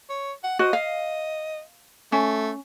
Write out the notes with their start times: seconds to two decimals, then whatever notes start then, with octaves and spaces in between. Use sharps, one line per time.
0.09 C#5
0.44 F#5
0.59 F#4 C5 D#5
0.73 F5
2.12 A3 C#4